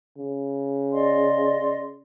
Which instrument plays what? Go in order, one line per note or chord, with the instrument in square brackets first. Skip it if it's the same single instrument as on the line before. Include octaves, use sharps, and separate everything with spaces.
[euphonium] C#3
[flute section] D5 D#5 C6